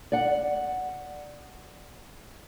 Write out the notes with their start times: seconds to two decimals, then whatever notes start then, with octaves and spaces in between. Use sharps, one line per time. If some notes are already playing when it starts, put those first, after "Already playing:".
0.12 D5 F#5